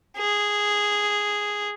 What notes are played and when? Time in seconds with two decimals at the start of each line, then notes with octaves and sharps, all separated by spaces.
0.17 G#4